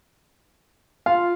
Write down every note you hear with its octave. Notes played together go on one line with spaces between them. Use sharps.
F4 F5